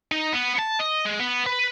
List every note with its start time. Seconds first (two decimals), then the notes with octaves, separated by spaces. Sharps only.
0.12 D#4
0.33 B3
0.59 A5
0.80 D#5
1.06 G#3
1.20 B3
1.46 B4